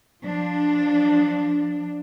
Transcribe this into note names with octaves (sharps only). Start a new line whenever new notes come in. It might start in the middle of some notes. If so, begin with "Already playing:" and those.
F3 D4